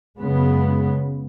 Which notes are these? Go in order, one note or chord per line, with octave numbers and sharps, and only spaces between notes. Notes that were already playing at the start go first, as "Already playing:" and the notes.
F#2 C#3 G#3 B3